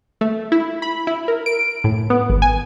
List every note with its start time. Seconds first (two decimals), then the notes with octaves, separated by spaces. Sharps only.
0.21 A3
0.52 E4
0.82 B5
1.07 E4
1.28 A#4
1.46 D7
1.84 A2
2.10 B3
2.30 G#1
2.42 G#5